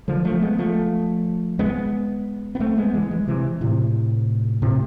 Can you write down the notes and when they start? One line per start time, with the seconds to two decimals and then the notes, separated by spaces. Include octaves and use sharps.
0.08 D3 F3
0.25 F3 A3
0.41 G#3 B3
0.58 F3 A3
1.59 G#3 B3
2.55 B3
2.60 A3 C4
2.77 G#3 B3
2.94 E3 G#3
3.11 E3 G#3
3.28 C3 E3
3.61 A2 C3
4.62 A2 C3